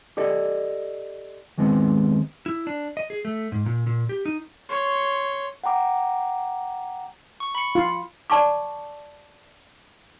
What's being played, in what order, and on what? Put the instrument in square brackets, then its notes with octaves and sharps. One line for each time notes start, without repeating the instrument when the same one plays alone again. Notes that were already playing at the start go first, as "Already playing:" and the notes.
[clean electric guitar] G4 A4 D5 D#5
D#2 D#3 G#3 B3 C4
[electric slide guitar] E4
D4
D#5
G#4
A3
G#2
A#2
A#2
G4
D#4
[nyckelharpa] C#5 C6
[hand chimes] F#5 G5 A#5 D6
[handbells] C#6
B5 C#7
[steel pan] F4
[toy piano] D5 A5 C#6 D6